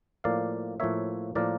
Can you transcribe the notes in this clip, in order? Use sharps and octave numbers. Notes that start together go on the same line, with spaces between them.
A2 F3 A#3 D5 F5
A2 F3 A#3 C#5 E5
A2 F3 A#3 A#4 D5